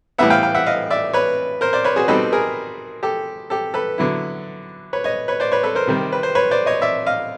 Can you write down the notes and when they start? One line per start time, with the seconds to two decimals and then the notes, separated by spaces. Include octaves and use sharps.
0.18 A2 E3 G3 B3 E5 F#5
0.30 F5 G5
0.43 F5 G5
0.55 E5 F#5
0.66 D#5 F5
0.90 D5 E5
1.14 B4 C#5
1.61 A#4 C5
1.73 C5 D5
1.84 B4 C#5
1.96 F#4 G#4
2.08 B2 G3 C4 D#4 A4 B4
2.32 G#4 A#4
3.03 G4 A4
3.50 G4 A4
3.74 A4 B4
3.98 D3 F#3 B3 E4
4.93 B4 C#5
5.04 C#5 D#5
5.28 B4 C#5
5.40 C5 D5
5.52 B4 C#5
5.63 A4 B4
5.75 A#4 C5
5.87 C3 D#3 G3
6.12 B4
6.23 C5
6.35 B4 C#5
6.51 C5 D5
6.66 C#5 D#5
6.82 D5 E5
7.06 D#5 F5